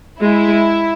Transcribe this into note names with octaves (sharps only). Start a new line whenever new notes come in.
G#3 E4